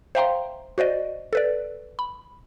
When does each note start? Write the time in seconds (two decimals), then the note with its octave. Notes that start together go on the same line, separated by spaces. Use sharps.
0.15 C5 E5 F5 G5 A#5 C6
0.78 F#4 C5 D5 D#5
1.33 A4 B4 D5
1.99 B5